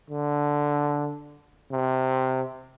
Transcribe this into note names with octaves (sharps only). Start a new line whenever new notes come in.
D3
C3